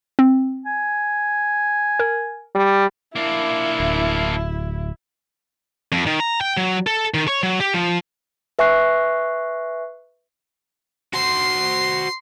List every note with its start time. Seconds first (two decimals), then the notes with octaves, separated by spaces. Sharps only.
0.19 C4
0.65 G#5
2.00 A#4
2.55 G3
3.16 A#3 D4 E4
3.80 D1
5.92 F2
6.06 D#3
6.20 A#5
6.41 G5
6.57 F#3
6.87 A4
7.14 D#3
7.28 C#5
7.43 F#3
7.60 G4
7.74 F3
8.59 B4 E5 G#5 C#6 F#6 C7
11.13 F#4 C5 C6